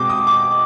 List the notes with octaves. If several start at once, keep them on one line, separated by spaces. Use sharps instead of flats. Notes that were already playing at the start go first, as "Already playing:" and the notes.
Already playing: B2 G#3 C4 G5 D6
D#6
D6